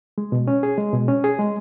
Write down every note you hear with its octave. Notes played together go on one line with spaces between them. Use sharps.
G#3
B2
C#4
G#4
G#3
B2
C#4
G#4
G#3